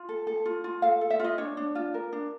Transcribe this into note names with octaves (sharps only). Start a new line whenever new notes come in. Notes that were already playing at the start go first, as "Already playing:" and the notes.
Already playing: F4
A4
A4
F4
F4
A4 F5
A4
E5
F4 D#5
D4 C#5
D4
F4
A#4
D4